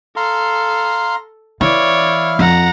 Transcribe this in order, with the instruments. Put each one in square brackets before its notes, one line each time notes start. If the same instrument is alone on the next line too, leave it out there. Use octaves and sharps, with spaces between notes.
[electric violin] A4 [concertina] F5 A#5 C6
[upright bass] E3 [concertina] E4 F5 [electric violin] C#5 D5
[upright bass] F2 [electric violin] F#5 A#5